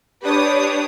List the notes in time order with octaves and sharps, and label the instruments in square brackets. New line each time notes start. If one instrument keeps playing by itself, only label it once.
[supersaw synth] D4 C#5 [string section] G4 B4 D#6